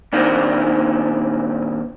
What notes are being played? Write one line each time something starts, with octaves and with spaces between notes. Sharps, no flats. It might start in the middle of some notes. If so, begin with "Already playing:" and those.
A#2 D#3 A#3 C4 D4 D#4